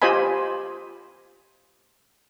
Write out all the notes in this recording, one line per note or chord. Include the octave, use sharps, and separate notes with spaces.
F4 G4 C5 D#5 G#5 B5